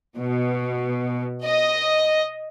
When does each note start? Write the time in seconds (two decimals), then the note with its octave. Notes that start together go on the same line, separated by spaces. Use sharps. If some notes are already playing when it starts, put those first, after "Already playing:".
0.17 B2
1.44 D#5